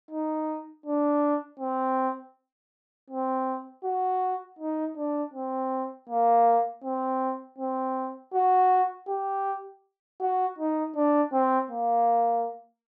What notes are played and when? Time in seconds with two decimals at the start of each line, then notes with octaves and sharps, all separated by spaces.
0.11 D#4
0.86 D4
1.60 C4
3.10 C4
3.84 F#4
4.59 D#4
4.97 D4
5.34 C4
6.09 A#3
6.84 C4
7.58 C4
8.34 F#4
9.08 G4
10.21 F#4
10.58 D#4
10.96 D4
11.33 C4
11.71 A#3